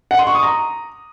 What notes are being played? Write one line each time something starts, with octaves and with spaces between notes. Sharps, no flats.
F#5
C6
C#6
D#6
A#5